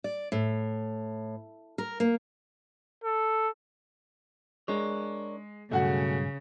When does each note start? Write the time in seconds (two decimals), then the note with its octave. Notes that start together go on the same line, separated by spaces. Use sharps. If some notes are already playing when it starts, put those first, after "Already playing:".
0.04 D5
0.32 A2
1.78 A#4
2.00 A#3
3.04 A4
4.68 G#3 D4 A#4 C#5
5.71 B1 G2 C#3 A3 F#4 G#4 F#5